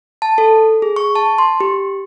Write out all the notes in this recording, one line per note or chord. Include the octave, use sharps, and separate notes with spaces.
A5
A4
G#4
C#6
A5
C6
G4